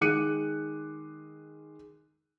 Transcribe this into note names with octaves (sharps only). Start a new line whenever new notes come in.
D#3 G#3 D6 F#6 C#7 D#7